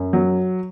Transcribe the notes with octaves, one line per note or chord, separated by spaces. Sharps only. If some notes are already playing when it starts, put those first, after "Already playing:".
Already playing: F#2
F#3